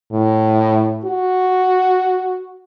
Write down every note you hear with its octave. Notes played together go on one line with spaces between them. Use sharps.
A2
F#4